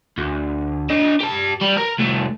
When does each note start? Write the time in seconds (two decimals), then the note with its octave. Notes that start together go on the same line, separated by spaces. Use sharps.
0.18 D2
0.90 D4 D#5
1.20 G4 A5
1.61 G3
1.78 A#4
1.99 C2 A3